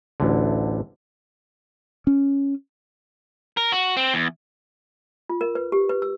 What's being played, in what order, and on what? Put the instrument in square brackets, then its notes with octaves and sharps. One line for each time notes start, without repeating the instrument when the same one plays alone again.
[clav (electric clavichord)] A1 D2 D3
[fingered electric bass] C#4
[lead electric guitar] A#4
F#4
C4
E2
[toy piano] F4
A#4
B4
G4
B4
E6